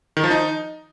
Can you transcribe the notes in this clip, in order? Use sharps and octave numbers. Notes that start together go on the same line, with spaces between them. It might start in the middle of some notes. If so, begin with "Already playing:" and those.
D#3
F3
D#4